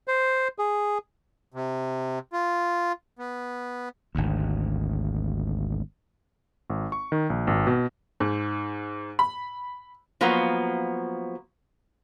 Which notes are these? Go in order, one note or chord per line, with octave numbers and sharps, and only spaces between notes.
C5
G#4
C3
F4
B3
G#1 D2
G#1
C#6
D#3
A#1
G#1
B2
G#2
B5
F3 F#3 A#3 B3